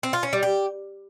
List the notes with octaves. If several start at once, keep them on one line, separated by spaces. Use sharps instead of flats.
C4
F4
C#4
G3
G4